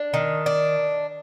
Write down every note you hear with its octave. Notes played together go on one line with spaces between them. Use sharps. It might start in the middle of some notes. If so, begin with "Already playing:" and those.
Already playing: D4
D#3
D4